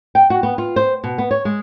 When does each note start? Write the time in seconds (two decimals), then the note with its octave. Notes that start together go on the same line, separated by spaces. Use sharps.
0.15 G5
0.30 F#4
0.43 B3
0.58 F4
0.76 C5
1.04 B2
1.18 B3
1.31 C#5
1.45 G#3